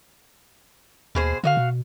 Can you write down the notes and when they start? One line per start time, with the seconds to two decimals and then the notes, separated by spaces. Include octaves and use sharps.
1.15 D#2 B2 G#4 C5
1.44 D3 F#4 D#5 F5
1.57 B2